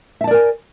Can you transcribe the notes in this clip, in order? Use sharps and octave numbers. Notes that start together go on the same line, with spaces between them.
A#4 D5 E5 G#5 A5